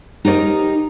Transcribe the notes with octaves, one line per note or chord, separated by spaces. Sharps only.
D#4 G4 A#4 D5 D#5